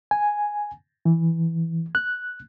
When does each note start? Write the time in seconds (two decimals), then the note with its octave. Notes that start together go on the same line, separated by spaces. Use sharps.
0.11 G#5
1.05 E3
1.95 F#6